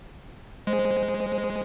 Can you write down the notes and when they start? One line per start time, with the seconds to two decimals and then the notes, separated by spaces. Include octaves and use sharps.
0.67 G#3 C5